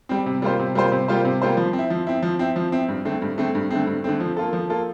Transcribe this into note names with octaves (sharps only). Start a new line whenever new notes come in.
G3 C4
C3
G3 A#3 F4 C5
C3
G3 A#3 F4 C5
C3
G3 A#3 F4 C5
C3
G3 A#3 F4 C5
F3
C4
E4
F3
C4 E4
F3
C4 E4
F3
C4 E4
G2
D3 A3 C4
G2
D3 A3 C4
G2
D3 A3 C4
G2
D3 A3 C4
F3
A#3 F4 A4
F3
A#3 F4 A4